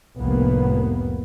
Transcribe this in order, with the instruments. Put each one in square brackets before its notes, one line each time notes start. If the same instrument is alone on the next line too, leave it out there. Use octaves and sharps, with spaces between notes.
[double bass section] F1 C2 A2 A#3 B3